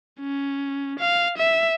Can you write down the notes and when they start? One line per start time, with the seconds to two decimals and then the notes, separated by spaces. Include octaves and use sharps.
0.21 C#4
0.99 F5
1.38 E5